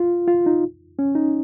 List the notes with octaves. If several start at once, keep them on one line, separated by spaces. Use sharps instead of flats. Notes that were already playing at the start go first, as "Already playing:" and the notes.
Already playing: F4
F4
D#4
C#4
D#4